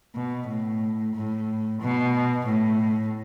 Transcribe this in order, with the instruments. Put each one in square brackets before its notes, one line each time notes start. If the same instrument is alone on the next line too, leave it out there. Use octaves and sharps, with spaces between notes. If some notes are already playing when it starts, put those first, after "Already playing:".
[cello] B2
A2
A2
B2
A2